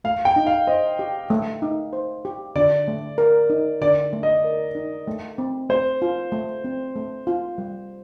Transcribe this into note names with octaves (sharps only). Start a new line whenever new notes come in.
A3 F5
G5
D#4
F5
C5 D#5
G4
A3
D#4
C5
G4
D3 D5
A3
A#4
D#4
D3 D5
A3
D#5
A#4
D#4
A3
C4
A3 C5
F4
A3
C4
A3
F4
G3